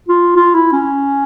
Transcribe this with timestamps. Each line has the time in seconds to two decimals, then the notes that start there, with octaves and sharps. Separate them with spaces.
0.08 F4
0.36 F4
0.55 E4
0.73 C#4